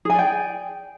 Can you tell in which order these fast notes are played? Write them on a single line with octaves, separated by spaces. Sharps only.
G#4 G#5 D5 G5